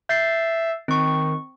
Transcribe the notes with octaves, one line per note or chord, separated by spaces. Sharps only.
E5 G6 A6 C7
D#3 C4 C#6